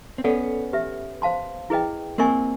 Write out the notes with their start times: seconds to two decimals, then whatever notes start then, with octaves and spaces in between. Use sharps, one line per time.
0.18 C4
0.24 B3 C#4 A4 D5 F#5
0.73 G4 B4 E5
1.22 C5 F5 A5 C6
1.70 E4 G#4 B4 D#5 G5
2.18 A#3 C4 A#4 D#5 G#5 C#6